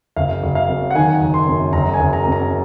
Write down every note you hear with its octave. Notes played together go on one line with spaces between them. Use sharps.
F#1 F5
F#1
F5
F#2
F#5
D#3 G#5
F#1
C6
F#2
F#1 A#5
G#5
F#1
A#5
F#2
A#5